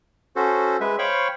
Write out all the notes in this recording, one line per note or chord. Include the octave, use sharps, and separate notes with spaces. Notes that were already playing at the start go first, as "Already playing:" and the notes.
C#4 F#4 A4 C5
G#3 B4 E5
C5 C#5 F5 G5 B5 C#6